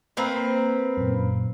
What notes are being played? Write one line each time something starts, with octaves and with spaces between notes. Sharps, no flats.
A#3 C4 B4
F#2 A#2